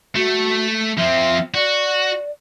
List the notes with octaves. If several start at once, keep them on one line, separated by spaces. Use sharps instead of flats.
A3 F#4
F3 C4 E5
F#4 D5